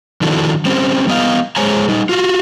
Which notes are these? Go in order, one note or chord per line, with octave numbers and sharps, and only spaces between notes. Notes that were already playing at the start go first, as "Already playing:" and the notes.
D#3 F3 D4 E4 F#4 A4
G3 C4 C#4 C5
G3 B3 D#5 F5
G#3 G#4 C5 C#5 G#5 A#5
G3 D#4
F4 F#4